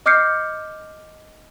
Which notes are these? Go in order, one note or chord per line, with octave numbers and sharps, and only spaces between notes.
D#5 D6 F6 G6 C7 C#7